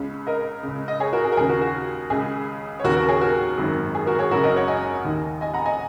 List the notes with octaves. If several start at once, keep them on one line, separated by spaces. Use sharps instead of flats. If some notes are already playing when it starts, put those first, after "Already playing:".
Already playing: C#2 C#3
A#4 D#5
C#2 C#3
D#5
G#4 C#5
F#4 A#4
G#4
A#4
D#2 C#3 G#4
F#4 A#4
F#4
C#2 C#3 G#4
C#5
D#2 C#3 F#4 A#4
F#4 A#4
G#4 C#5
F#4 A#4
G#1 F#2 D#3
G#4
F#4 A#4
G#4 C#5
F#1 F#2 C#3 F#4 A#4
A#4 D#5
C#5 F#5
D#5 G#5
D#2 D#3
D#5 G#5
F#5 A#5
D#5 G#5